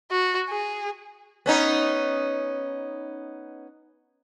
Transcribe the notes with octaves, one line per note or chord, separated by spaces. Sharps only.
F#4
G#4
B3 C#4 D#4